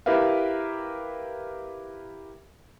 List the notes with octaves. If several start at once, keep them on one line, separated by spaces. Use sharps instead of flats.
E4 G4 A#4 B4 E5 F5